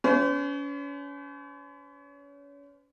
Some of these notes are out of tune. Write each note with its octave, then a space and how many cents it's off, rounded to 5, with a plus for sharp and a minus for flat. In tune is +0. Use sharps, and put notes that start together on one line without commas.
C#4 +35 C5 -45